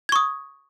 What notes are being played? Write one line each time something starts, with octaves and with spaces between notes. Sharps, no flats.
C#6 D#6 G#6